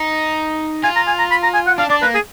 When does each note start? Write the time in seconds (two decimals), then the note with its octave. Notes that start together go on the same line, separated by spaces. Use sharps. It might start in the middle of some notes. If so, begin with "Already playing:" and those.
Already playing: D#4
0.84 F4 G#5
0.96 A#5
1.07 G#5
1.19 A#5
1.31 B5
1.43 A#5
1.54 G#5
1.66 F#5
1.78 D4 F5
1.90 D4 D5
2.02 A#3 B4
2.15 G#4